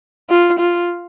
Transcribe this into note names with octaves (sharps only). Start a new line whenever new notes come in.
F4
F4